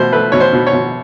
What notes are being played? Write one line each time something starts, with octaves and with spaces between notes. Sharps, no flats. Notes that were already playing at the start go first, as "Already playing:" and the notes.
Already playing: B2 A3 C5
A3 B4
B2 C#5
C5
B2
C#5
B2